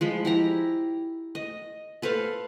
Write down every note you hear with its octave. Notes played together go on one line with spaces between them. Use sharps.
F3 G#3 B5
E4 G4 A#5
D#5
A4 B4 C5 F5